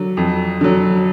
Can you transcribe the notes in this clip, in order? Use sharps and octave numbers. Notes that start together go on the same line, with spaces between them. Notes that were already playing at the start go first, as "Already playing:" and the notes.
Already playing: D3 F#3
F2
D3 F#3